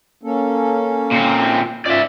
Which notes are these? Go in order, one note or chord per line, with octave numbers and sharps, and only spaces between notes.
A#3 C#4 A4
A#2 C4
G#2 C#4 F4 D5 E5